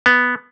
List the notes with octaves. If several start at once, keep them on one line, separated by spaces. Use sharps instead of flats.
B3